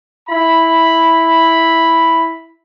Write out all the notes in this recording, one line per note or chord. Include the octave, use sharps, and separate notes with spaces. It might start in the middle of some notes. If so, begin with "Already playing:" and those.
E4 B5